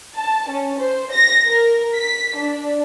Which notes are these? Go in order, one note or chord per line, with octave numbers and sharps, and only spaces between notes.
A5
C#4
C5
A#6
A#4
B6
D4